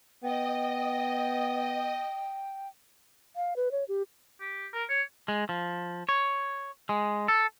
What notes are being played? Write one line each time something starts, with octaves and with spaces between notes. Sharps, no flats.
B3 D#5 G5
F5
B4
C#5
G4
G4
A#4
C#5
G#3
F3
C#5
G#3
A4